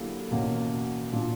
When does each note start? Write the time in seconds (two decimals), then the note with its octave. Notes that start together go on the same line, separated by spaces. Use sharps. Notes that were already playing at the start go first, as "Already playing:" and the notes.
Already playing: D3 F#3 A#3 E4 G4
0.31 E2 B2 A#3 C#4
1.12 A#2 A#3 D4